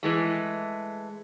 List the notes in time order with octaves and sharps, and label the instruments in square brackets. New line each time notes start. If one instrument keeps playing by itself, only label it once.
[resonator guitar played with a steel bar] E3 G#3 A3